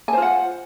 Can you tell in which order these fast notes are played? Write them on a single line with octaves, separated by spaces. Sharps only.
G#5 C5 F4 F#5